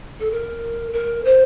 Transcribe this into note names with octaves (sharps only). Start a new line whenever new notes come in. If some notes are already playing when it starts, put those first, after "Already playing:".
A4
A#4
A#4
C5